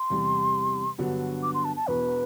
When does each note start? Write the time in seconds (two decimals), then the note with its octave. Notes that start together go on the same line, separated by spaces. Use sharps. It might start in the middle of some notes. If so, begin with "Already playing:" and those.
Already playing: C6
0.10 E2 C3 G3
0.98 G2 D3 F#3 B3 F#4
1.43 D6
1.54 C6
1.65 A5
1.76 A5
1.87 E1 E2 B2 B4